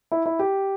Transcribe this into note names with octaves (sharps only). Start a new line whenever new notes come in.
E4
E4
G4